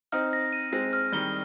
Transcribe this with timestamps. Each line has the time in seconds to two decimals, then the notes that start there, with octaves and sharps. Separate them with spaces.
0.12 C4 D#4 F6
0.33 A#6
0.53 D#7
0.72 G#3 C4 A#6
0.93 F6
1.12 D#3 G3 G7